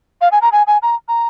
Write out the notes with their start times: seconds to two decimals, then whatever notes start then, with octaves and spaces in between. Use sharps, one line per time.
0.21 F5
0.32 G#5
0.42 A#5
0.52 G#5
0.67 G#5
0.82 A#5
1.08 A#5